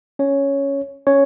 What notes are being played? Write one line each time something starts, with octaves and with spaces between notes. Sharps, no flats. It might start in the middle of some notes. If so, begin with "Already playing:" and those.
C#4 C#5
C#4 C#5